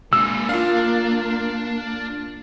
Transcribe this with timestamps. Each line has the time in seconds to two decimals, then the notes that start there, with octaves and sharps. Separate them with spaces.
0.13 G#3 A#3 D4 E6
0.49 D4 F4 F5